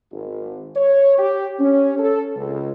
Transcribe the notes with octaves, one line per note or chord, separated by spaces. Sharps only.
G#1
C#5
G4
C#4
A4
C#2